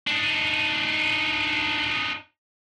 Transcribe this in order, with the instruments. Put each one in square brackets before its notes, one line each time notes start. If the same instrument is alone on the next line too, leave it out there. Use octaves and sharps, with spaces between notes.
[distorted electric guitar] D4 D#4